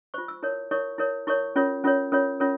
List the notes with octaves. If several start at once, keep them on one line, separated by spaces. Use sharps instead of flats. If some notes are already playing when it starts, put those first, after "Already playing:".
F4 C5 C#6
E6
E4 A#4 C#5
E4 A#4 C#5 C#6
E4 A#4 C#5
E4 A#4 C#5 C#6
C#4 F4 A#4 C#5
C#4 F4 A#4 C#5
C#4 F4 A#4 C#5
C#4 F4 A#4 C#5